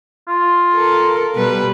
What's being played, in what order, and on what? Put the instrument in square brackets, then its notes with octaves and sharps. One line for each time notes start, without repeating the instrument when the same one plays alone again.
[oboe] F4
[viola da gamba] A4 A#4
B2 G3 B4